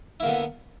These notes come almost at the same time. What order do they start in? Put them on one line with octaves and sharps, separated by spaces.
E4 A#3 D3 B3